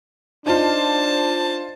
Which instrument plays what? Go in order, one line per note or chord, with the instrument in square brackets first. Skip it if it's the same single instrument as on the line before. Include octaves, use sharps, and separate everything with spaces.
[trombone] D4 [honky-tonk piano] D#4 F4 [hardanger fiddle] C5 A5